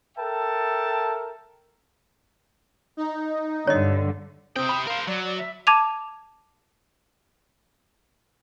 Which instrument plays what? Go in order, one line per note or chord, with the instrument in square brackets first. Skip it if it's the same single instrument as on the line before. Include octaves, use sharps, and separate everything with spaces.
[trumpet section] A4 A#4 E5 G5 A5
[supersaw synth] D#4
[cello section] G2 D3 [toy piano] C#5 D#5
[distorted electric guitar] C3 G5 [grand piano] C4 [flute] D#6
[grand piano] B5
[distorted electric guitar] A#4 C5 [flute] F5
[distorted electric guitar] F#3 [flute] D5
[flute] D5
E5
[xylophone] A5 D6 G#6 D#7 F7